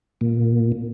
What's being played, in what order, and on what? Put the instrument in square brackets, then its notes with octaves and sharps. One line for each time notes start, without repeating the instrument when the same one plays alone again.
[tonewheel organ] A#2